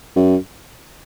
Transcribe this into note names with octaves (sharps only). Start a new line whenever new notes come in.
F#2